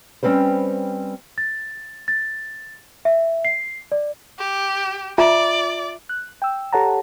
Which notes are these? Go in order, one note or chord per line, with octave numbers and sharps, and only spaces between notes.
G3 C4 C#4 B4 C5
A6
A6
E5
C7
D5
G4
F4 D5 E5 A#5
F#6
G5 E6
G4 A4 C#5 F#5 A5 A#5